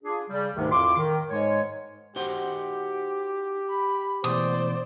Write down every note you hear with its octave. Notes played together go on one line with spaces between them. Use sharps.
D4 F4 G#4
C#3 G3
D2 G#2 C3 D#3
F2 A2 F4 C6 D6
D#3
G#2 G#3 C#5
D#4 F#4 G4 C5
B5
B2 E3 A3 C5 D5 D#6